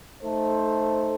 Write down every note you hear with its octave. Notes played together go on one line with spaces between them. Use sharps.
A3 D#4 A4 C5